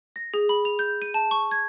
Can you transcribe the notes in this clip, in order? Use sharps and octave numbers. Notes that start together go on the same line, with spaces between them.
A#6
G#4
B5
F7
G6
D#7
A5
C#6
G#6